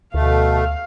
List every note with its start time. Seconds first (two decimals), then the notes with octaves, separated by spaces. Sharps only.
0.14 D2 B2 A3 F5